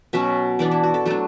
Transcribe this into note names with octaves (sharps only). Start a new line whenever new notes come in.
B2 F#3 C#4 E5
E3 B3 D4 D5
E4
F#4
A4
F#3 A3 D4 A4